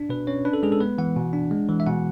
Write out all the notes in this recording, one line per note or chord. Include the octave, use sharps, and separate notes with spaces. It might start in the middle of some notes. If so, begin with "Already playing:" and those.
Already playing: D4
B2 B4
C#4 C#5
D4 B4
A4
G#3 G#4
A4
B3 B4
E3 F#5
B2
D4
G#3
E3
E5
B2 F#5